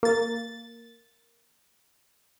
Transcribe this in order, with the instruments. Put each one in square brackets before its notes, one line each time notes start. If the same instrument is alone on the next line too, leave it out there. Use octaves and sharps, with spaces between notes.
[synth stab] A#3 A6